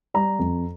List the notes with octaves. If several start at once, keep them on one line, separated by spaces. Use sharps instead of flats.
G3 A#5
F2